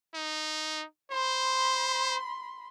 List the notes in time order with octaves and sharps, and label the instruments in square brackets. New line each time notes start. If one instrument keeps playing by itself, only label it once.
[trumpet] D#4
[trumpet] C5 [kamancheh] B5 C6